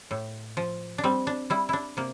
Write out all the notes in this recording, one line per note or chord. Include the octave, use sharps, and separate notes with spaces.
A2
F3
D4
G3 C4
D4
G3 E4
D4 E4
C3 A#3